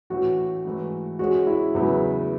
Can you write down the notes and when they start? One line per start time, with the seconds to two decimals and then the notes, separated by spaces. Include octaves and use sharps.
0.10 A2 E3 A3 C#4 F#4
0.65 G#2 E3 A3
1.19 G#3 C#4 F#4 G#4
1.47 E4
1.75 E2 C#3 F#3 B3 E4